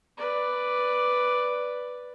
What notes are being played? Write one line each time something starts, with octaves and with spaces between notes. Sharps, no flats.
B4 D5